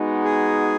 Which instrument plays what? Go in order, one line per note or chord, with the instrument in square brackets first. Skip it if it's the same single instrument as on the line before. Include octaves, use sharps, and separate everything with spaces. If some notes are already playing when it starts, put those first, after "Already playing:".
Already playing: [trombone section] G#3 B3 D#4 F#4
[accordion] G#4